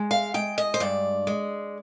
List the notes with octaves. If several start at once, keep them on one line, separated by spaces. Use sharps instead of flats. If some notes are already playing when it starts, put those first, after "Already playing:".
Already playing: G#3
F5
G#3 G5
D#5
C5
G2 D5
G#3